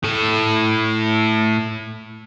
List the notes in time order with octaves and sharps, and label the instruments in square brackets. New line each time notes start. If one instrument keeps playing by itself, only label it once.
[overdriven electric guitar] A2 A4